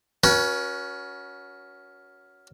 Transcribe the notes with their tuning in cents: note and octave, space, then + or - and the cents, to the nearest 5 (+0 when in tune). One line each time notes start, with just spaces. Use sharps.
C#4 +20 F#4 +0 B4 -40